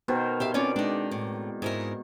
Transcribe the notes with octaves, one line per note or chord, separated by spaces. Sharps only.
B2 D#3 B3 A#4 C5
G4 E5 F5
C4 C#4 F4 C#5 D5
G#3 D4 D#4
A2
G#2 E4 A#4